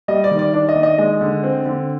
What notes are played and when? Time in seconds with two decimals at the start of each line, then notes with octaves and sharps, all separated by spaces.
0.08 G3 D#5
0.24 D5
0.31 D#3
0.39 D5
0.53 D4 D5
0.69 D#5
0.75 D#3
0.83 D#5
0.98 G#3 D#5
1.21 D3
1.43 C4
1.66 D3